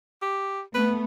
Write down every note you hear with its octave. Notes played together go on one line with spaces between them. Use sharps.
G4
A3 B3 B4